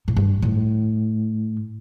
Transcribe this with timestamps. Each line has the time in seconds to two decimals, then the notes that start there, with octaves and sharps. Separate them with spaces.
0.08 A2
0.16 G2
0.42 A2